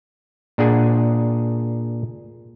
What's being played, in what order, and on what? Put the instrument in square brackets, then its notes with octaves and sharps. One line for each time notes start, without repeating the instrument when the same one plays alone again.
[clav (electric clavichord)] A#2 D4 G#4 F#5 G#5